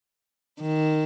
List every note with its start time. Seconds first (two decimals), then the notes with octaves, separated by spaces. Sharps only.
0.61 D#3